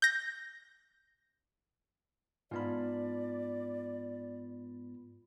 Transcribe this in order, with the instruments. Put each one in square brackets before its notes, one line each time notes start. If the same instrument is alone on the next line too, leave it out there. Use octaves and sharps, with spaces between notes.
[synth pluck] G6 A#6
[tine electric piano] G#2 B3 B5 [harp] F4 A5 F6 [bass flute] D5